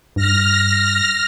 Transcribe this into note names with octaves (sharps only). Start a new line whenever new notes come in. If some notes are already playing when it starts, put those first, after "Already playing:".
G2 F6 A#6